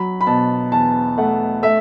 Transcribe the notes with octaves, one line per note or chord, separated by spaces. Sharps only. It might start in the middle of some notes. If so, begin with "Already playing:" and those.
Already playing: F#3 B5
B5
B2 A5
E2 A5
A3 F#5
A3 E5